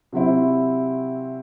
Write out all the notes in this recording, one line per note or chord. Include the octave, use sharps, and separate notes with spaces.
C3 F#3 C4 E4